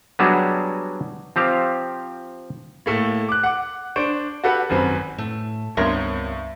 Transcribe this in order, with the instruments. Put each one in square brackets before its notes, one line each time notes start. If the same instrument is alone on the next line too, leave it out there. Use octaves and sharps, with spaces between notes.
[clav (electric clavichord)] F#3 G3 B3 D4 F#4 G#4
F3 C4 G4 F5
[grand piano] A2 A3 A#3
D6 F#6
F#5 D6
D4 C5 C#6 D7
F#4 G4 A4 B4 F#5
G#1 F#2 C4 B4
[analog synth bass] A2 [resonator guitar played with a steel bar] A3
[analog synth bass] C#2 [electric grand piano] G2 [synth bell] B3 E5 [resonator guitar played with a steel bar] C4 A#4 C#5